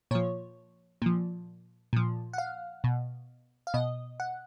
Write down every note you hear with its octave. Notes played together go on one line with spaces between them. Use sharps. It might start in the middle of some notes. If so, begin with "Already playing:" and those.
A#2 F3 C#5
A#2 F3
A#2 F3
F#5
F5
B2
F5
B2 D#5
F#5